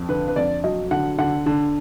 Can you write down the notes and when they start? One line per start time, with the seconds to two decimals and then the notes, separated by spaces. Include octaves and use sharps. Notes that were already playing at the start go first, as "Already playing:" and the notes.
Already playing: F2
0.09 D3 B4
0.28 B4
0.36 F2 D5
0.64 F#3 D#5
0.91 D3 F#5
1.19 D3 F#5
1.46 D3